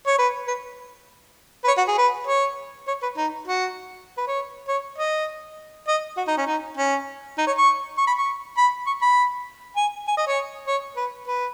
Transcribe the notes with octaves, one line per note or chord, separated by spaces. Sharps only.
C#5
B4
B4
B4
C#5
F#4
G#4
B4
C#5
C#5
B4
D#4
F#4
B4
C#5
C#5
D#5
D#5
F#4
D#4
C#4
D#4
C#4
D#4
C#5
C#6
C#6
B5
C#6
B5
C#6
B5
G#5
G#5
D#5
C#5
C#5
B4
B4